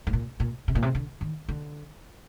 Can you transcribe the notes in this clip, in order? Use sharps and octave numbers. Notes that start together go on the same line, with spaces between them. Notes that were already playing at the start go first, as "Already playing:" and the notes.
G#2
A#2
A#2
C3
A#2
C3
D3
D#3
D3